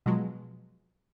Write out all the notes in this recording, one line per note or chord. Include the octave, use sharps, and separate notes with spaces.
B2 F3 F#3 G#3